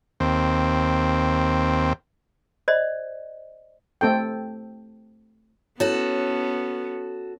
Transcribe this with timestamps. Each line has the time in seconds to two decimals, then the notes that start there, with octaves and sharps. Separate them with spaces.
0.20 D#2 C4
2.68 C5 D5 D#5
4.01 A3 C4 A4 G5
5.80 B3 C#4 E4 F#4 A4 C#5